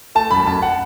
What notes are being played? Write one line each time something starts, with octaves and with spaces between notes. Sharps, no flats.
A3 A5
F#2 B5
F#2 A5
F#5